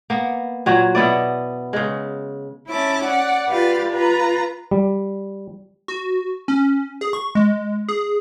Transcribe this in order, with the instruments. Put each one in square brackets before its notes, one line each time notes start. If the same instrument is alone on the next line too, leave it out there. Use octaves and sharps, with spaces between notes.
[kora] A#3 B3
A#2 F#3 F#4
B2 B3 E4 D5
C#3 G#3
[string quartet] C#4 E4 A5 D6
D5 F#5
F4 G4 B4 D5 F5
F4 B4 A#5
[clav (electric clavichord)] G3
[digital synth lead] F#4
C#4
G#4
C#6
G#3
G#4